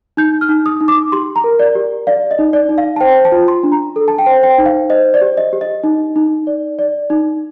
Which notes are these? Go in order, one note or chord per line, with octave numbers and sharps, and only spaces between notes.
D#4 G6
F6
D#4
D#6
D#4
D6
G4 C6
A#5
A#4
D5
G4
D5 F5
D#5
D#4
D5
D#4
F5
A5
C5 G5
A5
F4
C6
D4
A#5
A4
A5
G5
C5
G5
D#4
F5
C5 D#5
D5
G4
D#5
G4
D#5
D#4
D#4
D5
D5
D#4